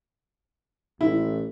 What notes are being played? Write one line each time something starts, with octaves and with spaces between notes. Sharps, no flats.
A1 E4